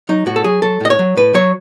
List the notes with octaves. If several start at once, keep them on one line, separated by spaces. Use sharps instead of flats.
F#3 D#4
A2 F#4
A4
F#3 G#4
F#3 A4
A2 D#5
C#5
F#3
A2 B4
F#3 C#5